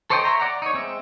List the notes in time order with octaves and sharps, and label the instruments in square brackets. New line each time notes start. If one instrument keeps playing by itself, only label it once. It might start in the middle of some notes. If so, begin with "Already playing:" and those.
[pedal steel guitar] A4 C5 C#5 D#5 G5
C#5 E5 A#5 C6
D5 F#5 A#5
D#4 C#5
G#3 C4 E5